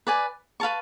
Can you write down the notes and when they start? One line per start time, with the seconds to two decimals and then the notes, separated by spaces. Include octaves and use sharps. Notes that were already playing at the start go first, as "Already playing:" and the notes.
0.07 B4 D5 G#5
0.60 B4 F5 A5 C#6